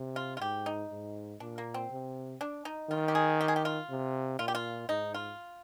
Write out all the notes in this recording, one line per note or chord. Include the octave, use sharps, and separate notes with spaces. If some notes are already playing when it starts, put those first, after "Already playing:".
Already playing: C3
F4
F4
G#2 G4
D#4
G#2
A#2 D4
A#3
C4
C3
D4
D#4
D#3 F4
G4
G#4
G4
G#4
G4
F4
C3
A#2 F4
G4
F4
G#2 D#4
F4